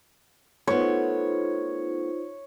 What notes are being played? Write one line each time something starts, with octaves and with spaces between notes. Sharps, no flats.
A3 B3 D#4 F4 C5 C#5